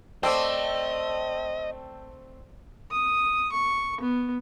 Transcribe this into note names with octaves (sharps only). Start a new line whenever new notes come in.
A3 C4 C5 D5 D#5 G5 A5 E6
D#6
C#6
B3